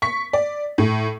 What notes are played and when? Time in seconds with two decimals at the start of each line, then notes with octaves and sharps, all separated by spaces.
0.02 C#6 B6
0.33 D5
0.78 A2